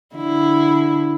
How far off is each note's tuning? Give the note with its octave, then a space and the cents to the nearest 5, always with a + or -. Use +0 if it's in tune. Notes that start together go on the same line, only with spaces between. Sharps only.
D3 +0 E4 +0